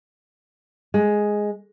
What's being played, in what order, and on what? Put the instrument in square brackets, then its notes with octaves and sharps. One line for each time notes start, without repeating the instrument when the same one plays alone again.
[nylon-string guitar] G#3